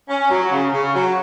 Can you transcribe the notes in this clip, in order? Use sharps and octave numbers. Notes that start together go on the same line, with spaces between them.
C#4
F#3
C#3
C#3
F#3